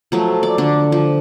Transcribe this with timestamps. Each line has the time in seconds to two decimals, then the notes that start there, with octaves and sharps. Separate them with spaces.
0.12 F3 F#3 A3
0.43 D5
0.58 D3 D4
0.92 F3